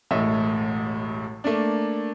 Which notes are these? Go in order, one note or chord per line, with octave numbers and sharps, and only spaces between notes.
E1 A1 A2 D#5 E5
A3 A#3 D4